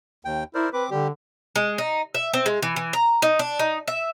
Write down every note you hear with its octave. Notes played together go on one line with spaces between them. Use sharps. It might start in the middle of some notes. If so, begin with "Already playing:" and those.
D#2 G5
E4 A#4 C5 D5
C4 B4 D6
D3 G3 G4
G#3
D#4
E5
C4
G#3
E3
E3
A#5
D#4
D4
D#4
E5